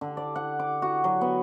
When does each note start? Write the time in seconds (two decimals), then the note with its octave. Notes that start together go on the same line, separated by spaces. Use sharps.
0.01 D3
0.17 D5
0.36 F#5
0.59 D6
0.82 F#4
1.04 F#3
1.21 B3